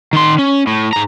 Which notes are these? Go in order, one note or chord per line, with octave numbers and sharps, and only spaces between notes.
D#3 C6
C#4
A2
G#2 A#5